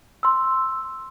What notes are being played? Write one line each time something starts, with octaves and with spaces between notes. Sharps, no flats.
C6 E6